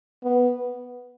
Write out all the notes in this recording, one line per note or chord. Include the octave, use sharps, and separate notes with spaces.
B3